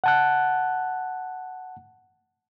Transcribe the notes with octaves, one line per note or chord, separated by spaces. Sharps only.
F#5 A5 F#6